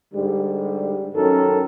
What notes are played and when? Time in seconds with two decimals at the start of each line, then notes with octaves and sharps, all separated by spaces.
0.14 G#2 D3 G3
1.15 F#2 D#3 C#4 A4 A#4